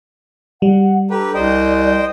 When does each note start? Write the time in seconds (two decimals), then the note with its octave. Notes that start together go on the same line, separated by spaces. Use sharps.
0.62 G3 F#5
1.10 D4 G4 A4 B4 A#5
1.35 C2 C5 D5 D#5 G5